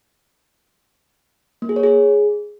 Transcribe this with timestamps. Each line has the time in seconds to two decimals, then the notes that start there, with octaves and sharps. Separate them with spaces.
1.62 A#3
1.69 G#4
1.76 C#5
1.83 G#4